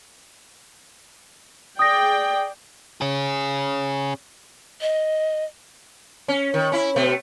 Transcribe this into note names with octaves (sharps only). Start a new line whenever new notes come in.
G#4 D5 G5 D#6 A#6
C#4 G#4
D#5
C#4
D#3
C#4 E4
B2 A3